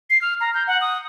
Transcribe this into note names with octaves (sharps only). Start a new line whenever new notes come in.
C7
F6
A#5
G6
F#5
D#6